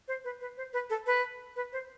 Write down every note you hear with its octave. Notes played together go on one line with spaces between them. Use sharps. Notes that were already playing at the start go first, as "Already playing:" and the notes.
C5
B4
B4
C5
B4
A4
B4
B4
C5